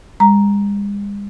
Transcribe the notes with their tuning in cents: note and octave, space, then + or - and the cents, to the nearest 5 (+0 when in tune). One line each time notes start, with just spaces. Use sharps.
G#3 -45 A#5 +0